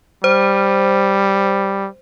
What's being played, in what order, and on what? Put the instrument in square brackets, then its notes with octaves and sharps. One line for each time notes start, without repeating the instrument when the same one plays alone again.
[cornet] G3 [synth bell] C5